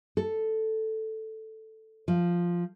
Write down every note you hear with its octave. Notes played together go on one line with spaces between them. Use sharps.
A4
F3